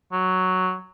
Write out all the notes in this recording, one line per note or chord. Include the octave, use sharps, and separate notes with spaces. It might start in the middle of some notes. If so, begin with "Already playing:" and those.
F#3